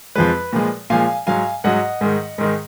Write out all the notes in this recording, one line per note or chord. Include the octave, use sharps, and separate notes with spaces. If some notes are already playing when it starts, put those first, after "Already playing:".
F2 F3 G#3 B4
A#2 F3 G#3
A#2 F3 G#3 F5 G#5
G#2 F#3 F5 G#5
G#2 F#3 D#5 F#5
G#2 D#3 G#3
G#2 D#3 G#3